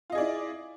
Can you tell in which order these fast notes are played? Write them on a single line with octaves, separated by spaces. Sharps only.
F4 D#5 G#4 D5 E4